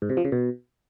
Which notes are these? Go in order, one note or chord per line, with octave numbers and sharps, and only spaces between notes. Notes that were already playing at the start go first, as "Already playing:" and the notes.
G#2
C3
F3
C#3
B2